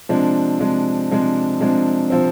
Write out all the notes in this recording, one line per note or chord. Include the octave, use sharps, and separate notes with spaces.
C3 F3 G#3 D4
C3 F3 G#3 D4
C3 F3 G#3 D4
C3 F3 G#3 D4
C3 F3 C4